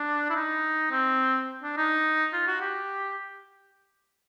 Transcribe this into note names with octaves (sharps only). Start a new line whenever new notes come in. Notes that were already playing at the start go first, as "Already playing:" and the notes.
Already playing: D4
E4
D#4
C4
D4
D#4
F4
F#4
G4